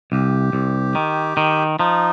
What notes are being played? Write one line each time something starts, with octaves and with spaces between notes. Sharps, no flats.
C2 G4
C2
D#3
D#3
F3 D#4